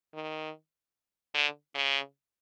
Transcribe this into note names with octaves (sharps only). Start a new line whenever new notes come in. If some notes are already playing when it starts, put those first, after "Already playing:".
D#3
D3
C#3